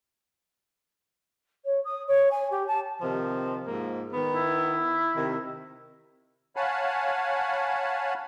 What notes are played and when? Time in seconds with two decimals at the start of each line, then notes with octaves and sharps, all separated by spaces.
1.65 C#5
1.85 D#6
2.07 C#5
2.31 G#5
2.51 G4
2.67 A5
3.01 C3 D#3 F3
3.67 G#2 F3 A#3
4.13 D#3 B3
4.35 E4
5.16 C3 D#3
6.56 C#5 F5 F#5 G#5 A5 B5